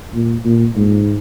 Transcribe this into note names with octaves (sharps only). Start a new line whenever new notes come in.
A#2
A#2
G#2